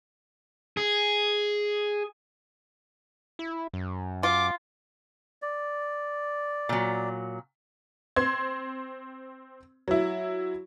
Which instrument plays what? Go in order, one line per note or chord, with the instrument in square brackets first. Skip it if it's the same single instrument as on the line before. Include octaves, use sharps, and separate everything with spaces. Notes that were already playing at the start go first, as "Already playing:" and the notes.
[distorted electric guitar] G#4
[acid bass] E4
F#2
[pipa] F4 [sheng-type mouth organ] D6
[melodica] D5
[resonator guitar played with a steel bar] A#2 F#3
[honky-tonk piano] C4 C6 G#6
F#3 E4